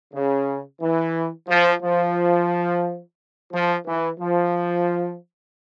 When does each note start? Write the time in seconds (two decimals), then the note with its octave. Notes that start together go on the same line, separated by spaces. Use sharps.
0.13 C#3
0.81 E3
1.49 F3
1.82 F3
3.52 F3
3.86 E3
4.20 F3